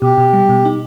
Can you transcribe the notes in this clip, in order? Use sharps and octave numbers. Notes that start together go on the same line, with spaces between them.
B2 G4
B2
G3
B2
D#4